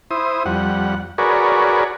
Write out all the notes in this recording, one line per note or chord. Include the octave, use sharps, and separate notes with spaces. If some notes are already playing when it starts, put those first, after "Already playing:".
E4 C5 D#6
F2 G3 F#5
F#4 G#4 A#4 B4 C#5 D5